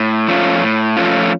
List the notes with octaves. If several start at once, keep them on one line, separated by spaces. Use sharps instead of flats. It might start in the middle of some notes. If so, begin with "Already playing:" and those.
Already playing: A2
F3 A3 C#4 F4
A2
F3 A3 C#4 F4